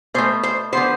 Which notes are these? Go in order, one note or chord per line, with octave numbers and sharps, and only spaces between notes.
B2 A3 C5
C5
D3 F3 B3 C5